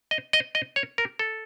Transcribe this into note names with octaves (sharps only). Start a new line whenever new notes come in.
D#5
D#5
D#5
C#5
A#4
A4